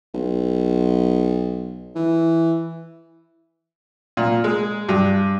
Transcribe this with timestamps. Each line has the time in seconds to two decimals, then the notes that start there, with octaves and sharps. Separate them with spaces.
0.14 B1
1.95 E3
4.17 A#2
4.44 G#3
4.89 G2